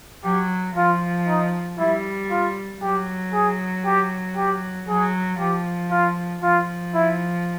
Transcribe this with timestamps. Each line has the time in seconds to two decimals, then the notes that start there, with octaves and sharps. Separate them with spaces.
0.24 F#3 G4
0.76 F3 F4
1.27 D#4
1.79 G3 E4
2.30 F4
2.81 F#3 G4
3.33 G#4
3.85 G4
4.36 G4
4.88 F#3 G#4
5.39 F3 G4
5.91 F4
6.42 F3 F4
6.94 E4